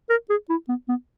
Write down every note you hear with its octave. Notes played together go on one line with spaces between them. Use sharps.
A#4
G#4
E4
B3
B3